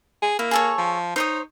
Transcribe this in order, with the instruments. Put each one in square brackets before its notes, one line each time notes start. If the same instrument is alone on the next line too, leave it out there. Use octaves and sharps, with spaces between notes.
[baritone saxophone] G#4
[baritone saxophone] A#3 [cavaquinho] E4
[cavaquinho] G#4 A4 C#5
[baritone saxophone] F3
[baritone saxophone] D#4 [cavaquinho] C5 C#5 D#6